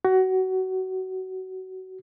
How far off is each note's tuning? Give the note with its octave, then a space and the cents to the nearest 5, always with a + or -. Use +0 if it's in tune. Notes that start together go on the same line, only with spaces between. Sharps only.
F#4 +25